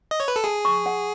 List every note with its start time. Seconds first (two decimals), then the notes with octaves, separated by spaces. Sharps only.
0.11 D#5
0.20 C#5
0.28 B4
0.36 A4
0.44 G#4 A5
0.65 C#6
0.86 F#5